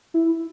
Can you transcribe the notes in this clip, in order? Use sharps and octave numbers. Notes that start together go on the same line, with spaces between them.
E4